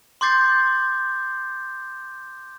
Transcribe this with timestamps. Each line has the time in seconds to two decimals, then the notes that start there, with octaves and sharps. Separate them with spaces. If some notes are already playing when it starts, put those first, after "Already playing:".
0.21 C6 D6 G6 A6 C7